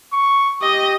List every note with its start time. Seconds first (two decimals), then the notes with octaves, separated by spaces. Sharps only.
0.13 C#6
0.62 G4 D#5